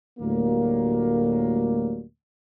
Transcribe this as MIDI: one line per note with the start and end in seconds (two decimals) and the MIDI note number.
0.20 2.03 38
0.20 2.03 45
0.20 2.03 54
0.20 2.03 55
0.20 2.03 58